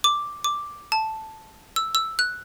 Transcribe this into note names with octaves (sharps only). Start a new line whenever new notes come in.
D6
D6
A5
E6
E6
F#6